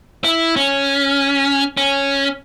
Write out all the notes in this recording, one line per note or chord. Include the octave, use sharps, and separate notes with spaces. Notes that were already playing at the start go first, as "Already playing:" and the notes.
E4
C#4
C#4